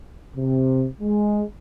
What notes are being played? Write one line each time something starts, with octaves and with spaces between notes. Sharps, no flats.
C3
G#3